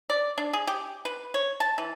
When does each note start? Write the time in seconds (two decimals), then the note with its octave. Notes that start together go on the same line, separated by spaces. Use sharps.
0.10 D5
0.38 D4
0.53 G#4
0.67 G4
1.05 B4
1.34 C#5
1.60 A5
1.78 E3